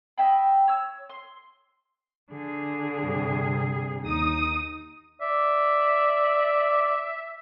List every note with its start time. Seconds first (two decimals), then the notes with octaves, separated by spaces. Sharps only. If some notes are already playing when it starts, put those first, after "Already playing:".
0.18 D#5 E5 G5 B5
0.68 C#5 E6
1.10 C6
2.31 D3 G#4
2.99 G2 C3 G3
4.03 D#2 D#4 D#6
5.21 D5 E5